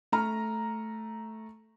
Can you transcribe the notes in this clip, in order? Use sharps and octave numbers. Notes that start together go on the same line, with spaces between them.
A3 A#5 F6